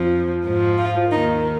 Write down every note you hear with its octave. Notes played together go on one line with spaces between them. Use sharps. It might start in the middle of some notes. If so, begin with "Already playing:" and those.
Already playing: F2 F3
G#2 F3
F4
D#2 D#3 D#4